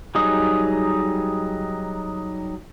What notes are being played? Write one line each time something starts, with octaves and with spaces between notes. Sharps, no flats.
F#3 G3 D#4 G#4 D#6